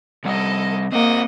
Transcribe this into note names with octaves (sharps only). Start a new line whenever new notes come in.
C3 G3 A4 D#5 F#5
A#3 C4 A#4 D#5 F#5